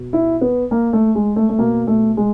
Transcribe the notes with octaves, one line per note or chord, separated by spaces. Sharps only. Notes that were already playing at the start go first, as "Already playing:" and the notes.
Already playing: B2
E4
B3
A#3
A3
G#3
A3
A3
B2 A#3
A3
G#3